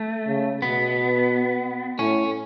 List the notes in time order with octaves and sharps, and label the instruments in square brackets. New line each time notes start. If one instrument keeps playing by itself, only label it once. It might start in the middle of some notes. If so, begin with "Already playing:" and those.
Already playing: [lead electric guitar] A3
[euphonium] C#3
[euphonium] B2 [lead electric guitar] B3
[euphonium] A2 [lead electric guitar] C#4